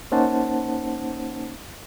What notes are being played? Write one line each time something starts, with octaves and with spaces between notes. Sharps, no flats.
A#3 C#4 D#4 C5 F#5 A5